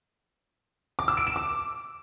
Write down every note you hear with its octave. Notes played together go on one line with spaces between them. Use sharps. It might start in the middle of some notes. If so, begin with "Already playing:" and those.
D6
E6
D7
E7
D6